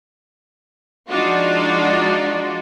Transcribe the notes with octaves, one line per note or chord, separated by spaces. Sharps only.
F3 G#3 D4 D#4 F4 F#4